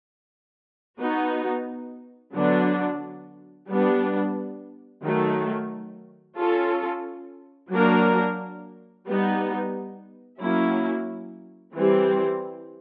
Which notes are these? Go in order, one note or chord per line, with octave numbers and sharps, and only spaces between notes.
B3 D#4 F#4
D3 F#3 B3 D4
G3 B3 D4
D#3 F#3 A3
C#4 F4 A4
F#3 A#3 D4 F#4 A#4
G3 B3 D#4
F#3 A#3 C#4 E4
E3 G3 C4